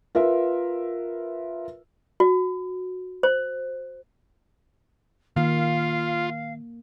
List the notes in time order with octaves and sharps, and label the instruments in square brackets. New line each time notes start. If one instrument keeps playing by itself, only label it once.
[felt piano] F4 A#4 B4 E5
[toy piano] F#4
C5
[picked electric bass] D#3 [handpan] A#3 [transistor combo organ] F4 [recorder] F5